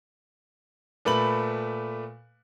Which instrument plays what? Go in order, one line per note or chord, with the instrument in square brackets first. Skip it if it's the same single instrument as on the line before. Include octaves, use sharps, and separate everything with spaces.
[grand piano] A#2 A3 B4 B5 F#7